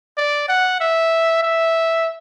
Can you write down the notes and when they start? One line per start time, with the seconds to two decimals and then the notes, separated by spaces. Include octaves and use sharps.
0.18 D5
0.49 F#5
0.80 E5
1.43 E5